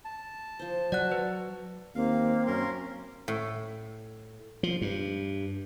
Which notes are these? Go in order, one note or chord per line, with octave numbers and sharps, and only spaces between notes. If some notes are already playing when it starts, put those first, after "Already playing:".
A5
F3 C5
F#3 F#4 D5 F#5 F#6
B4
D#2 A#3 C4 F5
F#2 C#4 A#4 C6
A2
F3
G2